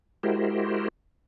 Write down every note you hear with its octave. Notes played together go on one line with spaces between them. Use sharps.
G#3 E4 F#4 G4 A#4 C5